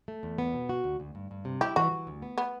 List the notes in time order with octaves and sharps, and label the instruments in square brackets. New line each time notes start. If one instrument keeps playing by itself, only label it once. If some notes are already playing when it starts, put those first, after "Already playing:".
[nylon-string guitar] A3
E2
B3
B2
F#4
D2
D2
G2
G2
C3
[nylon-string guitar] E4 [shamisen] G4
[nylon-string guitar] E3 [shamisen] F#4
[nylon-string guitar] E3
D2
B3
[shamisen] B3